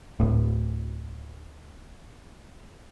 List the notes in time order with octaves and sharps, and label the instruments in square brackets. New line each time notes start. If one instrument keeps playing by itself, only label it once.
[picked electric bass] D1 A2